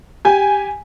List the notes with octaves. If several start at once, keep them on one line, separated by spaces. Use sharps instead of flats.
G4 G#5